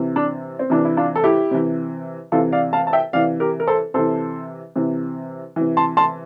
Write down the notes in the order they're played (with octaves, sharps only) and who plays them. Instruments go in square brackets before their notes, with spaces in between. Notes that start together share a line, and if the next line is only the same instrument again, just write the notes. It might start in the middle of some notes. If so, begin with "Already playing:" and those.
Already playing: [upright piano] C3 E3
D4
C4
C3 E3 D4
E4
D4 F4
A4
E4 G4
C3 E3
C3 E3 F4 A4
D5 F5
F5 A5
A5
E5 G5
C3 E3 D5 F5
G4 A#4
A#4
A4 C5
C3 E3 A4 C5
C3 E3
C3 E3
A5 C6
A5 C6